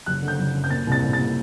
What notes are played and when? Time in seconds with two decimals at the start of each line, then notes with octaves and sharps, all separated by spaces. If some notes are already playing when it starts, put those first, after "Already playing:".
0.06 F#1 F#6
0.22 D3
0.28 G6
0.39 F#1
0.54 F#2
0.64 G6
0.70 A#2 A6
0.87 C2
0.92 A6
1.02 C2
1.13 A6
1.19 A#2